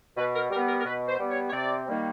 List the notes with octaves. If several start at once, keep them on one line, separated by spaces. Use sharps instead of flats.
B2 B4
A#4
G3 B3 A#4
A#4
A#4
B2 B4
C5
G3 B3
C#5
C#5
C3 D5
D#3 G3 A#3